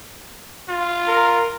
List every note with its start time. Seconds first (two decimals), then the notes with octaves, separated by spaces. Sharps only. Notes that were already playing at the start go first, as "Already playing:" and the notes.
0.69 F4
1.08 A#4